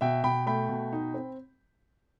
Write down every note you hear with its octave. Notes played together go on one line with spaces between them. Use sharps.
B2 E5 G5
B2 G5 B5
A3 G5 B5
B2
D#4
C4